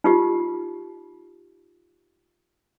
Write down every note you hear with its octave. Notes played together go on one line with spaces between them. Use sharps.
D#4 F4 G4